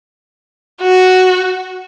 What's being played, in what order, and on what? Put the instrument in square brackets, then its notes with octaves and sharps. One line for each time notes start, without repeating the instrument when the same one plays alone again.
[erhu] F#4